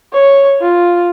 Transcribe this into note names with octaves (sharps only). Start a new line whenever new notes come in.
C#5
F4